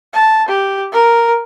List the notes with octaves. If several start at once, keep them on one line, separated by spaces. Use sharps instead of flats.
A5
G4
A#4